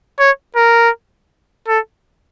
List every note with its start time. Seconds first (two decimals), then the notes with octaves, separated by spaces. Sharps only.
0.19 C#5
0.56 A#4
1.68 A4